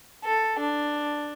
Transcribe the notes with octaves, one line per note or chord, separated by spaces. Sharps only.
A4
D4